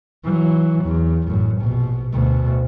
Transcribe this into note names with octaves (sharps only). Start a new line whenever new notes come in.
E3 F#3
E2
A1 F#2
A#1 B2
D2 B2